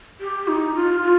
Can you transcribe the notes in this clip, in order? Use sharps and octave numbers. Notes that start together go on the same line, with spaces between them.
G4
D#4
F4
F4